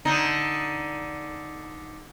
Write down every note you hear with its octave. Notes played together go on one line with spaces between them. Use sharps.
D3 D#4